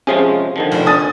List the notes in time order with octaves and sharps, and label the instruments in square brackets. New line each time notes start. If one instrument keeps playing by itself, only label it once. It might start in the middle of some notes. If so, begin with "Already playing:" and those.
[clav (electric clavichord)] C3 F3 G#3 [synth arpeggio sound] C#4 G#4 F5
[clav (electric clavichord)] D3 D#3 F3
[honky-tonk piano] F1
[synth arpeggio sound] D4 [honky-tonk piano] G#5 D#6 A6